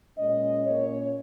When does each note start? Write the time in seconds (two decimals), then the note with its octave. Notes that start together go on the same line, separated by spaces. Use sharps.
0.18 A#2 G#3 C#4 D#5
0.66 A#2 A#3 C#4 C#5